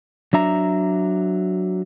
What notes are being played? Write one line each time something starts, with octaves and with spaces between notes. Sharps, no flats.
F#3 D4 E5 A#5